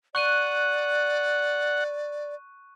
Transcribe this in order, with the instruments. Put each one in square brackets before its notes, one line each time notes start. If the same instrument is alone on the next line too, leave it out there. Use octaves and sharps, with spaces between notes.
[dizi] D5 [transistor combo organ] F#5 [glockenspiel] C#6 F#6 D#7